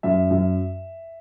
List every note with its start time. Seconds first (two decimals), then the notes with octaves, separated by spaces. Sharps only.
0.03 F#2 E5
0.31 F#2